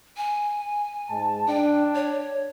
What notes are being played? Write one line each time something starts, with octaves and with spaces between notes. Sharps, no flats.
G#5
G#2 D#4 A5
D4 G5
C#5